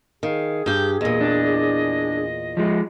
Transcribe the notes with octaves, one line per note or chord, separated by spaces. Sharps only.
D#3 G#4 F5
G2 G4 G6
E2 A#2 D#5
D4
F3 G#3